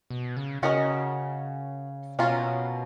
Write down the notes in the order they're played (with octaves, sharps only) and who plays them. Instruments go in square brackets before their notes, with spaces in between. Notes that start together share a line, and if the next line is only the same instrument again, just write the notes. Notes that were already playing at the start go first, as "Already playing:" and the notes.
[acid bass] B2
C#3
[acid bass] C#3 [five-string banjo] C#4 F#4 A#4 D#5
[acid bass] B2 [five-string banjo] F#3 A#3 C#4 F4